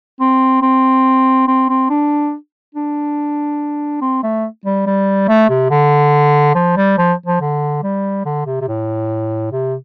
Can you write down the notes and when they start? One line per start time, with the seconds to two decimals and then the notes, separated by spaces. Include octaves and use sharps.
0.20 C4
0.62 C4
1.48 C4
1.69 C4
1.90 D4
2.75 D4
4.02 C4
4.24 A3
4.66 G3
4.87 G3
5.29 A3
5.50 C3
5.71 D3
6.55 F3
6.77 G3
6.98 F3
7.26 F3
7.41 D3
7.83 G3
8.25 D3
8.47 C3
8.61 C3
8.68 A2
9.52 C3